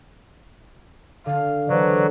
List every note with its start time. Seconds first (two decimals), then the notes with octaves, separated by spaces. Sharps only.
1.26 D3 F5
1.69 D3 E3 F#3 G#3 B4 C5 D5